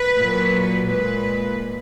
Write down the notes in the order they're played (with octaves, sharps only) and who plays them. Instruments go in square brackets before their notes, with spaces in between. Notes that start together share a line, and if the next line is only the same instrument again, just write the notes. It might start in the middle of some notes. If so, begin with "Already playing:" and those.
Already playing: [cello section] B4
A#2 F#3
A#2 G#3 B4